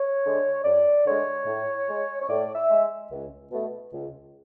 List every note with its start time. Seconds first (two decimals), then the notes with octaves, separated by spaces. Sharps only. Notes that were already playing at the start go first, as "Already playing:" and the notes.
Already playing: C#5
0.24 D3 G#3
0.64 F#2 D5
1.06 D3 G#3 C#5
1.46 A2
1.88 G#3
2.21 C#5
2.28 A2 D5
2.55 E5
2.70 G#3
3.11 C#2
3.52 B2 A3
3.93 C#2